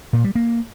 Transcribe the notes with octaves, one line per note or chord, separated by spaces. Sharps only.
A#2
G3
A#3